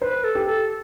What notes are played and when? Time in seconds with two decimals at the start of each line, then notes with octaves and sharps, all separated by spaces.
0.01 B4 C5
0.24 A4
0.35 G4
0.46 A4